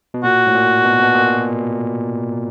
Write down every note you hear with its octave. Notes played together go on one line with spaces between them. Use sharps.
B2
A#2 F#4
A2
A#2
B2
B2
A#2